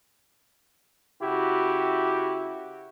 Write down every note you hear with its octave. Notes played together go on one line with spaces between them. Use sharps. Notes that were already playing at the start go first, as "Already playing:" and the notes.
C#3 E4 F#4 G4